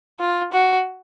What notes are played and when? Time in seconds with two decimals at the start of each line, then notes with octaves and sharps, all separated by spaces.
0.19 F4
0.52 F#4